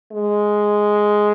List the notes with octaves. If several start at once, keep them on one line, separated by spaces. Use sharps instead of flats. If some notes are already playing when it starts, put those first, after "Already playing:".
G#3